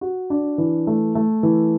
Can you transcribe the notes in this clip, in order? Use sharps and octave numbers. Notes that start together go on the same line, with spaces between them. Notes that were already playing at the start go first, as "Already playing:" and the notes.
F#4
D4
E3
A3
A3
E3